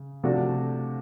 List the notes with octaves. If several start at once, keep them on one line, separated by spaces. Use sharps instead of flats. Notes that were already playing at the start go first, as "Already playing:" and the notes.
Already playing: C#3
C3 F3 A3 D4 F#4